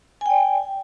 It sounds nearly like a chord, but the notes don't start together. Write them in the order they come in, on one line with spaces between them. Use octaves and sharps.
G#5 G5 D5